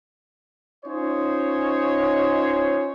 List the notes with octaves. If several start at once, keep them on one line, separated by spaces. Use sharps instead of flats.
C#4 D#4 F4 C5 C#5 D#5